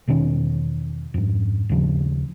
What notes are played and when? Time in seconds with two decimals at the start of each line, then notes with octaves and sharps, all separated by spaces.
0.07 E2 B2 D#3 C#4
1.14 F2 G#2
1.69 D#2 C#3 F3